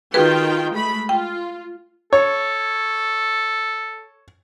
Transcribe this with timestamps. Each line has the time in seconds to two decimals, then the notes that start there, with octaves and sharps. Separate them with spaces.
0.14 D#3 F4 F#4 G#4 B4 G5
0.74 G#3 A3 B5
1.09 F4 G5
2.13 A4 C#5